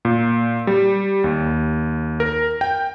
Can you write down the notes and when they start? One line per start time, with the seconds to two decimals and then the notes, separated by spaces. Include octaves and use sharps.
0.05 A#2
0.67 G3
1.24 D#2
2.20 A#4
2.61 G5